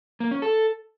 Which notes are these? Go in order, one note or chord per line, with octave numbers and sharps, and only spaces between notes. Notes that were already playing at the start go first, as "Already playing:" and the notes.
A#3
C#4
A4